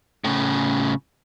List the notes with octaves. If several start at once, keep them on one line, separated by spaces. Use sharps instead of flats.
A2 C#3